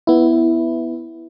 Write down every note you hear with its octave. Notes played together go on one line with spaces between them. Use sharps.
B3 E4